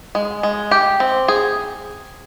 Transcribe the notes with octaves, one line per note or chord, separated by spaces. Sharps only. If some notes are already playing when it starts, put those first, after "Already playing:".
G#3
G#3
G4
C4
G#4